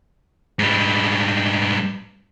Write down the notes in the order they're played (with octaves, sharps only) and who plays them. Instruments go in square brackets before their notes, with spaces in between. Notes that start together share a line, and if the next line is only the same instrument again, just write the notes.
[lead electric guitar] G#2 G3